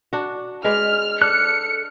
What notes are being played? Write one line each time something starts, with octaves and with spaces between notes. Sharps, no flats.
D4 F#4
G#3 B4 D5 F6
D4 A4 F6 F#6 C#7